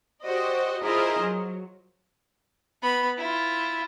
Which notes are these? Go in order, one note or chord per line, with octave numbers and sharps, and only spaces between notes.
F#4 G4 C5 D5 D#5
E4 F4 G#4 A#4 C5 D#5
F#3
B3 B5
E4 F4